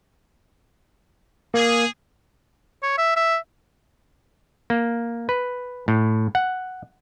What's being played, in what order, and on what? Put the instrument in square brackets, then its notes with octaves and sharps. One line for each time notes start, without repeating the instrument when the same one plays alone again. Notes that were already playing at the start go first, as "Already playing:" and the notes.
[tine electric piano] A#3 [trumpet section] G#4
[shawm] C#5
E5
E5
[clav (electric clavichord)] A#3
B4
A2
F#5